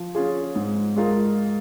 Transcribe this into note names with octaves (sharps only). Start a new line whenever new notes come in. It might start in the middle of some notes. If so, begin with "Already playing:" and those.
Already playing: F3
C#4 F4 G#4
G#2
G#3 F4 A#4